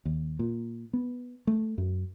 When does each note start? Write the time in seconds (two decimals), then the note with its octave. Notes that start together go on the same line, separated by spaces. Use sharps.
0.05 D#2
0.39 A#2
0.93 B3
1.47 A3
1.78 F#2